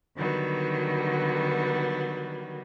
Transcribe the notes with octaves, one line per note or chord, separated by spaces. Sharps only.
D3 D#3 F#3 G3 B3